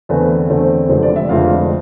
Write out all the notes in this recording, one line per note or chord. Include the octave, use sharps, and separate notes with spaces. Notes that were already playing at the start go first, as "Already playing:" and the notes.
E2 D3 A3 C4 B4
E2 D3 A3 C4
F1 F2 D3 F3 G#3 C5
D5
E5
F1 F2 D3 F3 G#3 F5